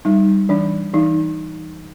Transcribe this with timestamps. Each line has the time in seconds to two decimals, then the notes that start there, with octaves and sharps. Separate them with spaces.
0.05 G3 D#4
0.49 E3 D4
0.94 E3 D#4